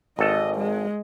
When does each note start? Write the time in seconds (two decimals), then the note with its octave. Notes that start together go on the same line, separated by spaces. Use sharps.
0.19 G#1 A4 D#5
0.56 G#3